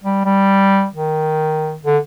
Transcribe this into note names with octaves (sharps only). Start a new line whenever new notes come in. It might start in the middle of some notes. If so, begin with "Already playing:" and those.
G3
G3
D#3
D3